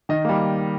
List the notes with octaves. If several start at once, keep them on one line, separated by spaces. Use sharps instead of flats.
D#3 D#5
G3 A#3